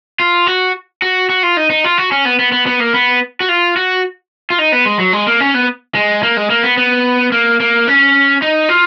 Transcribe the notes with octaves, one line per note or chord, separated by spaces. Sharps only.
F4
F#4
F#4
F#4
F4
D#4
D#4
F4
F#4
C#4
B3
B3
B3
B3
A#3
B3
F#4
F4
F#4
F4
D#4
B3
G#3
F#3
G#3
A#3
C#4
B3
G#3
A#3
G#3
A#3
B3
B3
A#3
A#3
C#4
D#4
F4